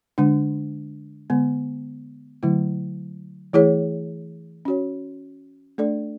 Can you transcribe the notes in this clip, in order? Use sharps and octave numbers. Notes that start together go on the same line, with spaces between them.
D3 G#3 D4
D3 G#3 B3
D3 F#3 A3 E4
E3 A3 E4 G#4 C#5
C#4 F#4 C#5
A3 D4 A4 D5